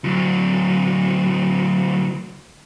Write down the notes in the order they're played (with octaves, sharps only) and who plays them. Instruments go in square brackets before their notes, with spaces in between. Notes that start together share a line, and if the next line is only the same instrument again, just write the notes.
[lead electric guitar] D2 F#3